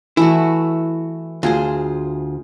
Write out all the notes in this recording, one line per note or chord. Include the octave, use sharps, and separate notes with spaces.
E3 A3 E4 F#4
D2 F4 G#4 C5